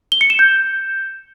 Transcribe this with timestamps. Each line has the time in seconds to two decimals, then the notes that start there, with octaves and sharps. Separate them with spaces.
0.12 G7
0.21 C#7
0.30 E7
0.39 G6